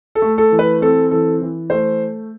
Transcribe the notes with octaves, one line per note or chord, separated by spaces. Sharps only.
A4
A3
A4
E3
B4
C4 A4
E3 A4
E3
A3 C5